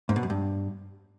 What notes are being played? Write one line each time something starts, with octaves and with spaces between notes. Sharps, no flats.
G#2
B2
F#2
G2